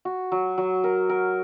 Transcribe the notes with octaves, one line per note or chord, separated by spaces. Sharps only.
F#4
F#3
F#3
A#4
A#4